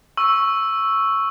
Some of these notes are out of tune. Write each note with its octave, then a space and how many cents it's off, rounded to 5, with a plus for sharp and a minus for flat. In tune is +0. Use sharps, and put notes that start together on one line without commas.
C#6 +0 E6 +0